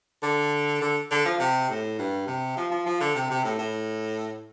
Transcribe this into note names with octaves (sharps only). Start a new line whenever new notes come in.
D3
D3
D3
F3
C3
A2
G2
C3
F3
F3
F3
D3
C3
C3
A2
A2